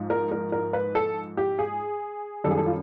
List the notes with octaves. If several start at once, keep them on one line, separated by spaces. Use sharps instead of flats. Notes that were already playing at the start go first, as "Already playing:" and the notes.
Already playing: G#2 F3
A#4
A#4
A#4
B4
A4
G4
G#4
F#2 D#3 G3 A4
G#4
A4
F4